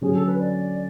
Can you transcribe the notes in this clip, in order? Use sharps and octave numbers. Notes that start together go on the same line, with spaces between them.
D3 F#3 C#4 G#4
A4
B4
D5